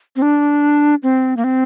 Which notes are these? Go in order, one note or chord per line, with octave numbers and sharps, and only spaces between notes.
C4
D4
C4
A#3
C4